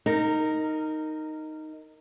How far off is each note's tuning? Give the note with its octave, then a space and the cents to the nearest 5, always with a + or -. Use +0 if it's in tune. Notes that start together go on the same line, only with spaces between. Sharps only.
D#4 +0 A#4 -15